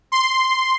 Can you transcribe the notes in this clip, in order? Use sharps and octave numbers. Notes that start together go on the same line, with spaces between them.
C6